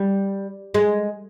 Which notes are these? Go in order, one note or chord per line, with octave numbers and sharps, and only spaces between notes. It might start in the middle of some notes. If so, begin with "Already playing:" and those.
Already playing: G3
G#3